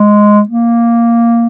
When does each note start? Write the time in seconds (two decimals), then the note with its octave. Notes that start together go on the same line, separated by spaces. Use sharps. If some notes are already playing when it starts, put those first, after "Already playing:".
Already playing: G#3
0.49 A#3